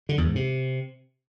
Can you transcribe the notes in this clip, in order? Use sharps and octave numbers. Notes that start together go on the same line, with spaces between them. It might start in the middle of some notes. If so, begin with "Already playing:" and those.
D3
E2
G#2
C3